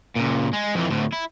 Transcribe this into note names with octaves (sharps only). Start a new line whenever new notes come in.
C#2 A#2
G#3
F2 E3
D2 A2
E4